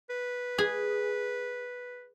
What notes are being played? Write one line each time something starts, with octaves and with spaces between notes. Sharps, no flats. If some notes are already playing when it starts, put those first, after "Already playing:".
B4
G#4